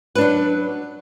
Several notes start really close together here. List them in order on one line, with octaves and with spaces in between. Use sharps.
B4 D4 F#3